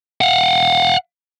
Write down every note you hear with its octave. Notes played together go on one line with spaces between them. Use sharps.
F5 F#5